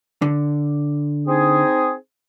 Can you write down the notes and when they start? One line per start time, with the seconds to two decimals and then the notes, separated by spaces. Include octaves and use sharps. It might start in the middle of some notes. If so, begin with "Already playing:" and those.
0.22 D3
1.27 C4 D#4 G#4